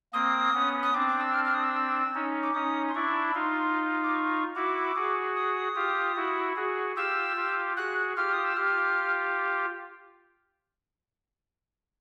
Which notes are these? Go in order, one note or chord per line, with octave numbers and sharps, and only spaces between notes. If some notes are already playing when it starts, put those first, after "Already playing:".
A#3 C4 D#6
B3 C#4
D#6
C4 D4 D6
D6
E6
F6
F6
D#6
E6
C#4 D#4
D6
C#4 D#4 D#6
C6
D4 E4 C#6
B5
D#4 F4 C6
D6
C#6
E4 F#4 D6
F#4 G#4
D#6
F4 G4
E4 F#4
F#4 G#4
F4 G4 E6
F4 G4
F#4 G#4 F#6
F4 G4 F6
D#6
E6
F4 G4 F6